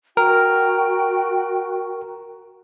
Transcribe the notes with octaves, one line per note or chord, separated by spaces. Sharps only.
F#4 A#4 G5